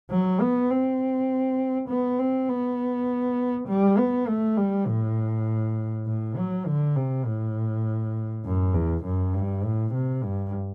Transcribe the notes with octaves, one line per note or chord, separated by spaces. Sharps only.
F#3
B3
C4
B3
C4
B3
G3
B3
A3
G3
A2
A2
F#3
D3
C3
A2
F#2
E2
F#2
G2
A2
C3
G2